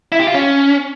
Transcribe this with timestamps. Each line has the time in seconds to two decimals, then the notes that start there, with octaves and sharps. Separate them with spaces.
0.12 E4
0.20 G4
0.27 F4
0.34 C#4